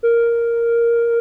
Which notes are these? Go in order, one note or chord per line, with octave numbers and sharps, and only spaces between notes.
A#4